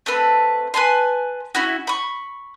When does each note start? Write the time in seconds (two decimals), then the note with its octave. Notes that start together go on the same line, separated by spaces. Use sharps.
0.06 A3 C4 B4
0.74 B4 G#5 A5 C6
1.55 C#4 E4 F#4
1.87 B5 C#6